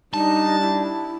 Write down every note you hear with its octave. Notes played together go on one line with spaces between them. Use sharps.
G3 D4 D#4 A5
E4